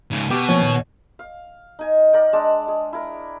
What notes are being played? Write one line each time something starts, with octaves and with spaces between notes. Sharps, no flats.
G#2 C#3
B2 G4
F3 A#3 C4 C#4
A#2 D#3
F5
D#4 G#5
A#4 D5 G5
G#3 D4 A5
G#4
E4 A#4